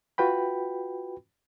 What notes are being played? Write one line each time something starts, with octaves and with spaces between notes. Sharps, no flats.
F4 F#4 B4 G5 B5